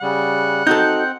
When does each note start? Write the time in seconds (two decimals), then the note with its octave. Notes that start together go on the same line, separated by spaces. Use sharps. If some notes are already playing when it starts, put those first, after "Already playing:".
0.01 C#3 G3 F#5
0.67 C4 D#4 F#4 A4 G6